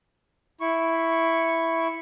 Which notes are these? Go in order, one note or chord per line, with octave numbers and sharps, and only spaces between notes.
E4 C#6